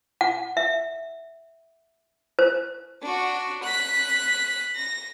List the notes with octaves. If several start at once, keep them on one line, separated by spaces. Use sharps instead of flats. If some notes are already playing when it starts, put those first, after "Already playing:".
F#5
E5
C5
D4 F#4
F#6 B6
A#6